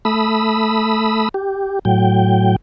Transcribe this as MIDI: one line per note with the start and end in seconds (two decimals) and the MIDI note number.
0.05 1.29 57
0.05 1.29 83
0.05 1.29 87
0.05 1.29 88
1.34 1.79 67
1.85 2.56 45
1.85 2.56 54
1.85 2.56 79